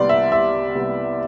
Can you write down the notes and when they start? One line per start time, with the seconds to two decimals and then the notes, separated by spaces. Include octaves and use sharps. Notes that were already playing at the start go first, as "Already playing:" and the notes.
Already playing: C2 C3 G3 B3 D5 C6
0.09 E5
0.32 C2 E5
0.75 C3 G3 B3